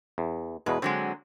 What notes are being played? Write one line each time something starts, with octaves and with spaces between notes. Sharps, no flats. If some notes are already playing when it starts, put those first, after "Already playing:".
E2
E2 B2 G#3 B4
D3 F#3 G#3 C4